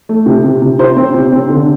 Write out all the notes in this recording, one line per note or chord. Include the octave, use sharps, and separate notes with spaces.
A3
C3
C3
C3
C3 C5
C4
C3
C4
D3